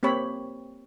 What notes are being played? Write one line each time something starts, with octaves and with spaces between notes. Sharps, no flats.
A#3 C4 G4 C#5 B5